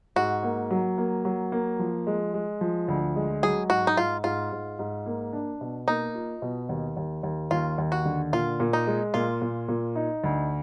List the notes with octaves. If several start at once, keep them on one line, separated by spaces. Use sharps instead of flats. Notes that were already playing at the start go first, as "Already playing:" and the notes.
G#2 F#4
A#3
F#3
A#3
F#3
A#3
F3
G#3
G#3
F3
D2
G#3
F#3 G#4
G#2 F#4
D#4
G#2 F4
G#2 F4
G#2
G#2
A#3
D4
B2
A#3 D#4
F4
B2
D#2
D#2
D#2
D#2 F4
D#2
F#4
D3
A#2 F4
A#2
D#4
G#3
A#2 F4
A#2
A#2
D#4
D2